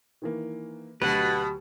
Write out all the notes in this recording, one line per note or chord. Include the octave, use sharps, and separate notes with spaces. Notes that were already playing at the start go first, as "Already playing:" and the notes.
D#3 E3 A#3
D2 B2 F#3 G4 B4 F#5